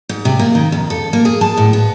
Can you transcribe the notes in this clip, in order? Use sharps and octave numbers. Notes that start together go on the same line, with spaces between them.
G#2
C3
A#3
D#3
F2
A4
A#3
G#4
A5
A2
B3